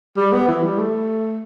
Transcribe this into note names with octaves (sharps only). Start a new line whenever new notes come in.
G3
B3
E3
G3
A3